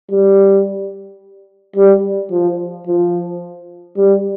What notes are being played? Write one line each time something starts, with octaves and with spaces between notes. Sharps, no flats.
G3
G3
F3
F3
G3